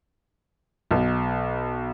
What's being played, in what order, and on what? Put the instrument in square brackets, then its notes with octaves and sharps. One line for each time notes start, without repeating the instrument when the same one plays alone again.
[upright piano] B1